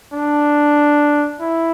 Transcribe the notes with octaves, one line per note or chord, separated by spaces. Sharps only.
D4
E4